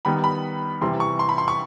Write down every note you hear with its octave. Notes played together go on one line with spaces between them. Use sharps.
D#3 G3 B3 B5
B5
C3 E3 G3 C6
C#6
C6
B5
C6
C#6